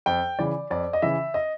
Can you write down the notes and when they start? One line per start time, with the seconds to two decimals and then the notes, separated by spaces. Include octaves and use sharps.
0.06 F2 G5
0.38 C#3 E3 D5
0.70 F2 D5
0.93 D#5
1.02 C#3 E3 E5
1.34 D#5